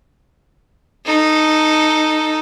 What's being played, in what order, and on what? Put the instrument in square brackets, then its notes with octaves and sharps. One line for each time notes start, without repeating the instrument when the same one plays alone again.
[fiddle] D#4 A4